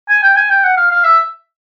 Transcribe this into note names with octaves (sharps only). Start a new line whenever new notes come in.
G#5
G5
G#5
G5
F#5
F5
F5
E5